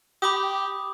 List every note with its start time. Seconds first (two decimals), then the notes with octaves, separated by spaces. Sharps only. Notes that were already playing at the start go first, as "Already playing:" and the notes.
0.22 G4 B5 D6 D#6